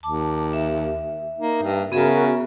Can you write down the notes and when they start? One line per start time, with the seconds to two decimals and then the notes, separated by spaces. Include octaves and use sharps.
0.03 D#2 A5 D6
0.53 E5
1.38 A#3 D#4
1.62 G2
1.92 C#3 B3 F#4 G#4 A#4 E5